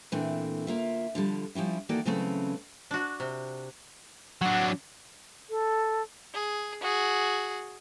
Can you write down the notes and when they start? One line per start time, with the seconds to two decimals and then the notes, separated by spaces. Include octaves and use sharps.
0.12 A#2 E3 A3 C4 D4
0.67 D2 A#3 F4 E5
1.15 D3 F3 G3
1.55 F3 G3 C#4 E4
1.89 D#3 E3 A#3 F#4 A4 D5
2.06 C#3 E3 F#3 A3 C4 C#4
2.91 D4 F#4
3.20 C3
4.42 F#3 D4 F#5
5.50 A4
6.34 G#4
6.81 F#4 G#4